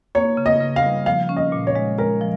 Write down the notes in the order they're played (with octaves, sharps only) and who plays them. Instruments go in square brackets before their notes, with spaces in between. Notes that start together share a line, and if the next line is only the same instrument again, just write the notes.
[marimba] A#3 [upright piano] C#5
[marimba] C#3
[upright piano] D#5
[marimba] C#3
[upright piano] F5
[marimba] G3
[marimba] F3 [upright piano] F5
[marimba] C#4
[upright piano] D#5
[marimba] A#2
[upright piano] C#5
[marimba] G#3
[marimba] G#3 [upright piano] A#4
[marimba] F3